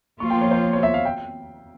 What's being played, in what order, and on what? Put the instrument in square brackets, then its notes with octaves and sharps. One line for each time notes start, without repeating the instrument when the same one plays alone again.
[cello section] F3 A#3 F4 [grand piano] C#6
[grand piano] G5
C#5
C5
C#5
C#5
E5
F5
G5